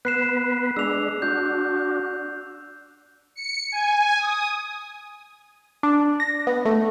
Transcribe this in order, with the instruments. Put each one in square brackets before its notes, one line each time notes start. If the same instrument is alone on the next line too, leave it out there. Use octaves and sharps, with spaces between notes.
[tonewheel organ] B3 B4 [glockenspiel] F#6 C7 E7
[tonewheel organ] G#3 D4 [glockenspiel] E6 F7
[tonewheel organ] D4 F#4 [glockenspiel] G6
[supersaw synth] C#7
G#5
D#6
[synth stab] D4
A#6
B3
A3